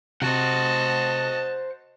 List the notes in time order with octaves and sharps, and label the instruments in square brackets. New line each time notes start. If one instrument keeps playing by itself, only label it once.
[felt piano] C3 [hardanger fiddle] F#4 D#5 [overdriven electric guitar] C5 F#5 [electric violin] A5